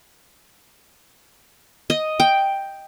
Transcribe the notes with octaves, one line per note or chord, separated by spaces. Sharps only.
D#5
G5